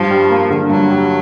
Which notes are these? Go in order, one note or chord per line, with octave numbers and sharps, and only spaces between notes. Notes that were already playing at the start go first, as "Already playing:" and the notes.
Already playing: G2 F3
G3
A#3
D3
G2 F#3
G3